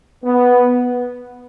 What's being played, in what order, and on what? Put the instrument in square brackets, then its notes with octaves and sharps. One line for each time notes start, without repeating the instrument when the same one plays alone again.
[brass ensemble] B3